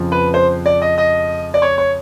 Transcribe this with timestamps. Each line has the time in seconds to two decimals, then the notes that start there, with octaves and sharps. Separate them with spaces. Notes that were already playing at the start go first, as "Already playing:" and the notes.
Already playing: F2 C#3 F3
0.12 B4
0.34 C5
0.66 D5
0.82 D#5
0.98 D#5
1.54 D5
1.62 C#5
1.78 C#5